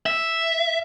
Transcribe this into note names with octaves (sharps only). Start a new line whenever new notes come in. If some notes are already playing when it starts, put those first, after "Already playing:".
E5